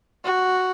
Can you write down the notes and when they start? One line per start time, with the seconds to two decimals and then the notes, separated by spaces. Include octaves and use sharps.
0.25 F#4